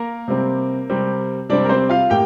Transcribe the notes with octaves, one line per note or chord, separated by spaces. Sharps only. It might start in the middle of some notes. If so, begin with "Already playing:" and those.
Already playing: A#3 A#4
C3 G3 C4
C3 G3 C4
C3 G3 C4 D4 D5
A#4
C4 C5
F4 F5
A2 A#3 G4 G5